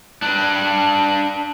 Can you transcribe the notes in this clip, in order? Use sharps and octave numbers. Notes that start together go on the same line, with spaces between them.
D4 B4